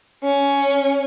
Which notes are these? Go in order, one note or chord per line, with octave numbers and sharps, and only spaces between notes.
C#4